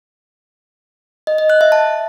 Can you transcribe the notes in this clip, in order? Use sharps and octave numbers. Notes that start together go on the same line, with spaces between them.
D#5
D#5
F#6
E5
A5